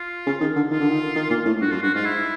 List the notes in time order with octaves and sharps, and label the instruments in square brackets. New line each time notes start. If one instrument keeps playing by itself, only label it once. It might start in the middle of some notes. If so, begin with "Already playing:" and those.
Already playing: [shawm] F4
[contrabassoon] C#3
D#3
D3
[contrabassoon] D#3 [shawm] F4
[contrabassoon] D3
D#3
D#3
A#2
A2
[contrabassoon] G2 [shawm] F#4
[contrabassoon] F#2 [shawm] F4
[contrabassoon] G2 [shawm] F#4
[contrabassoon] G#2 [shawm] F4
[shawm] E4